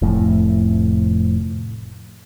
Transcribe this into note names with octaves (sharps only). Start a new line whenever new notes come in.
F1 F2 A2